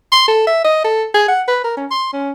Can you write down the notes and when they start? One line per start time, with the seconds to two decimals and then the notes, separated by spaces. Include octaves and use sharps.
0.12 C6
0.28 A4
0.47 E5
0.65 D#5
0.84 A4
1.14 G#4
1.28 F#5
1.48 B4
1.64 A#4
1.77 C#4
1.91 C6
2.13 C#4